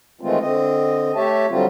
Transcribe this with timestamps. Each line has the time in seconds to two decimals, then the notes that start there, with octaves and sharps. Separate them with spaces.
0.21 D#3 E3 G#3 A3 C4 F4
0.41 D3 C4 D#5
1.15 A3 G4 C#5 E5 A5
1.49 D3 F#3 G3 C4 F4